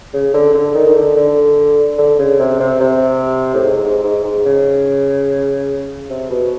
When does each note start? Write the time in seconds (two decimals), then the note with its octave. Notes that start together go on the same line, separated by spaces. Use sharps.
0.14 C#3
0.34 D3
0.54 D3
0.75 D#3
0.87 D#3
0.96 D3
1.16 D3
1.98 D3
2.19 C#3
2.39 C3
2.60 C3
2.80 C3
3.54 A2
3.63 G#2
3.83 G#2
4.04 G#2
4.24 G#2
4.45 C#3
6.10 C3
6.30 B2